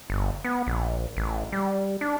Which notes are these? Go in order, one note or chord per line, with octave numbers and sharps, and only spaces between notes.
G1
B3
A#1
A1
G3
D4